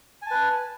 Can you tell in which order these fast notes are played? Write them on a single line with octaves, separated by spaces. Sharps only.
G#5 A5 B4